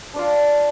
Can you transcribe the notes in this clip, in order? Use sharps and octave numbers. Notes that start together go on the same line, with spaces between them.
D4 F4 D5 F5